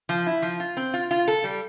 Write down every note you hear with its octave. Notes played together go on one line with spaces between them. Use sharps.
F3
E4
F3
F4
C4
F4
F4
A4
G3